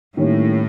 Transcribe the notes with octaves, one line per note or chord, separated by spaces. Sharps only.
A2 D#3 G3 A#3 C#4 E4